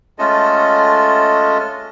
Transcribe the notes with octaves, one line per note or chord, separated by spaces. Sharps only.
G#3 A3 C#4 F4 A4 D#5